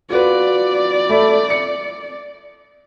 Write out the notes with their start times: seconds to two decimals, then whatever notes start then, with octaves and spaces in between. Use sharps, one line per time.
0.10 F4 F#4 B4 D5
1.10 A3 B5
1.50 C#7